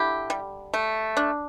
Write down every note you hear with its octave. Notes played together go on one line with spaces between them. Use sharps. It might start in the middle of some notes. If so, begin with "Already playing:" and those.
Already playing: D3 E4 G4
G3
A3
D4